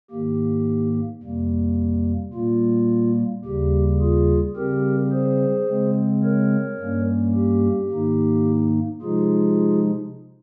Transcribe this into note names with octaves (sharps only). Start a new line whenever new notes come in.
G#2 D#3 A#3 G4
F2 C3 G3 A#3
A#2 G3 A#3 F4
D#2 C#3 G3 G4
F4 G#4
C#3 G3 C4 G4 A#4
G#4 C5
C#3 G#3 C4
A#4 C#5
G2 G3 A#3 C#4
G4
G#2 D#3 A#3 D#4
C3 F3 G#3 D#4 F4 G#4